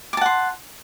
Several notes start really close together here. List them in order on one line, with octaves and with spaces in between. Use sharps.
D6 A5 F#5 C6